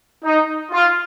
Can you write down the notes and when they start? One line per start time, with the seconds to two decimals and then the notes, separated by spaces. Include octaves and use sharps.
0.24 D#4
0.71 F4